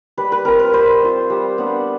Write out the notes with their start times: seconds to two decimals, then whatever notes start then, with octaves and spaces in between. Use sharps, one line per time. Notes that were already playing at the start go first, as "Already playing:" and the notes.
0.17 G3 B4
0.32 B4
0.45 C4 F4 A#4
0.59 B4
0.73 G3 C5
1.02 C4 F4
1.30 G3
1.58 B3 D4